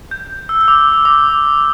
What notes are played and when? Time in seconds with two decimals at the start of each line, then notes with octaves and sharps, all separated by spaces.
0.11 G6
0.49 E6
0.61 E6
0.68 D6
1.05 D6